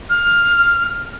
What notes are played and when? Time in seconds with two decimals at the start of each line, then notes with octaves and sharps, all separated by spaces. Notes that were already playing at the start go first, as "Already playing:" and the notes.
0.10 F6